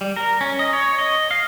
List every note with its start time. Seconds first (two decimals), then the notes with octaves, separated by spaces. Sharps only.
0.01 G3
0.16 A#4
0.41 C#4
0.59 D#5
0.73 C#5
0.99 D#5
1.31 F5